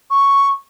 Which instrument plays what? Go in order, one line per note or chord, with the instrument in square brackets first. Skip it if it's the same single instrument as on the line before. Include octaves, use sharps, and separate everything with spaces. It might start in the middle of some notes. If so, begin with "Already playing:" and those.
[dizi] C#6